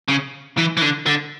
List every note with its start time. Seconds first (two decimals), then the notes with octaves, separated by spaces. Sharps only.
0.08 C#3
0.57 E3
0.77 E3
0.82 D3
1.06 D3